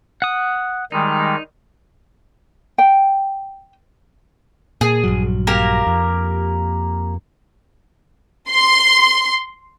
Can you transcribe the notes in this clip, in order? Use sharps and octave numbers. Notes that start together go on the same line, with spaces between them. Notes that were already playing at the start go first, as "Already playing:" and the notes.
F#5 D#6
D#3 G3 G#3 D#4
G5
A#2 G#4
A#1 G2 F#3
A#3 G4 A#4
F2
C6